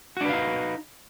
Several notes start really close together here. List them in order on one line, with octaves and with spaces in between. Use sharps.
F#4 D4 B4 F5 D#4